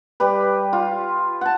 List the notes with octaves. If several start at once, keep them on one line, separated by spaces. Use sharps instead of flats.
G3 G4 B4
F4
F#5 A5